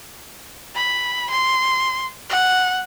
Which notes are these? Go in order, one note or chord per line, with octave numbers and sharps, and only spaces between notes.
B5
C6
F#5